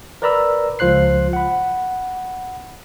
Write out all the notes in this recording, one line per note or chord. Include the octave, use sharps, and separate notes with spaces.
A#4 B4 D5 A#5 B5 E6
C#2 F3 F4 C5 F#6 C7
F#5 B5